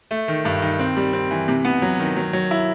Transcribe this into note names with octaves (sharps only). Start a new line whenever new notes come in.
A3
D#3
G2
D#3
C4
G3
C4
E3
C3
B3
F#3
D#3
F#3
F#3
E4